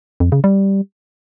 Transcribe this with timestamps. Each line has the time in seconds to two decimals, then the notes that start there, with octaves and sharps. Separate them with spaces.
0.20 F2
0.32 C#3
0.44 G3